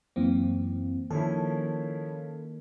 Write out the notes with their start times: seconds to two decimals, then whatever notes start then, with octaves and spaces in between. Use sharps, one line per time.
0.16 F#2 E3 A#3 C4
1.10 D#3 F3 C#4 E4 A4